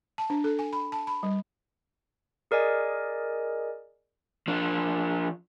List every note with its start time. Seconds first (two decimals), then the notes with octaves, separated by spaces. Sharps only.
0.18 A5
0.30 D4
0.44 A4
0.59 G#5
0.73 B5
0.92 A5
1.07 B5
1.23 G3
2.51 G#4 A#4 D5 D#5 G#5
4.48 F3 D4